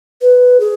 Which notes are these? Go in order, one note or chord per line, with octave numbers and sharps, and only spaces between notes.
B4
G#4